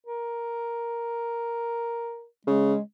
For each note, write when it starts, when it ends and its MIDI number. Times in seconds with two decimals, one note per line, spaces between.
0.07 2.26 70
2.47 2.75 49
2.47 2.81 56